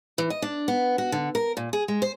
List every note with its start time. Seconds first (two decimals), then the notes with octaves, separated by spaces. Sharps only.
0.18 E3
0.30 D#5
0.42 D4
0.68 B3
0.98 F#4
1.12 D3
1.35 A#4
1.57 A#2
1.73 G#4
1.88 G#3
2.02 C5